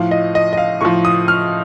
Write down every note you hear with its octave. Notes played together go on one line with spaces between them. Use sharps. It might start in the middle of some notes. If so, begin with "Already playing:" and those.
Already playing: A2 F3 F5
D#5
D#5
D#5
F5
A2 F3 C#6
D#6
F6